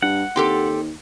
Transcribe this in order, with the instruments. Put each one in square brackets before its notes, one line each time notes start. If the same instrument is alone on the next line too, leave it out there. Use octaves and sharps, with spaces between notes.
[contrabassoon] G2 [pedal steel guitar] F#5
[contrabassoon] D#2 [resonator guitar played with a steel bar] C4 G4 A4